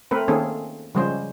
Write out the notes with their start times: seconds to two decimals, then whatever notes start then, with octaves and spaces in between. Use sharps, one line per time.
0.11 A3 C4 A#4 B4
0.28 D#3 A#3 C4 C#4 G#4 A4
0.95 C#3 F3 G3 G#3 C#4 C5